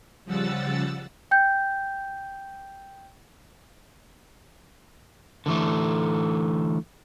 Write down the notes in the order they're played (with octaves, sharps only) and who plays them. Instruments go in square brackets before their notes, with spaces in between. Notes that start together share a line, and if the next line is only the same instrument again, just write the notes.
[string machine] C#3 F3 G3 F#5 E6 A6
[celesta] G5 G6
[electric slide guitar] D3 E3 A3